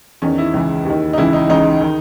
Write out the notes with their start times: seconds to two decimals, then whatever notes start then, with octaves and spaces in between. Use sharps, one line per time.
0.22 E2 D#3 C#4
0.38 E4
0.54 C#2 C#3 E3
0.85 D#2 D#3
1.13 D#4
1.18 C#2 C#3 E3 E4
1.33 D#4
1.49 C#2 C#3 E3 D#4
1.81 D#3